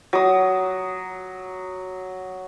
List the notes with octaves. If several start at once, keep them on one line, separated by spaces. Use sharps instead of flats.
F#3 D#6